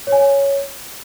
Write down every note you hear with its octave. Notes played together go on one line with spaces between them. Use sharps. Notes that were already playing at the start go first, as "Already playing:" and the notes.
C#5
G#5
C#5